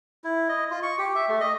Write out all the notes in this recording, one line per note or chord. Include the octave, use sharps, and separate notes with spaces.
E4
D#5
F4
C#6
G4
E5
A3
D#5